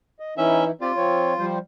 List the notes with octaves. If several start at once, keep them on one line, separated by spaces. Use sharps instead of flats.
D#5
E3 C#4 D#4 E4 E5
C4 F4 G4 D5
F3 C4 C#5
F3 G3 C5